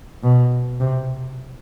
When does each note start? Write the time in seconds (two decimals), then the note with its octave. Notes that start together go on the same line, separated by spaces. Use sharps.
0.24 B2
0.80 C3